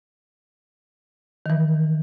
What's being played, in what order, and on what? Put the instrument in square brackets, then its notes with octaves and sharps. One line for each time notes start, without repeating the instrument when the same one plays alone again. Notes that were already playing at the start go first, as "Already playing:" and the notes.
[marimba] D#3 E3